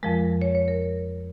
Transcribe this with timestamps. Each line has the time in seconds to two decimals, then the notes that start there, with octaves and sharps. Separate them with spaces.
0.03 F2 F3 G#3 A#4
0.42 C#5
0.55 C#5
0.68 A#4